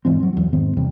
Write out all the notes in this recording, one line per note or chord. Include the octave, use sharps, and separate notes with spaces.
E1 G#2 E3 C4
F#3 C4
E2 F#3
G#2 D#3 B3 C4
E2 G2 C3